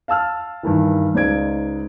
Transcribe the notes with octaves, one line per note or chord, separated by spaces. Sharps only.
F5 A5 E6 F6
G2 D#3 E3
C#2 D#4 C5 D5 G#6 D7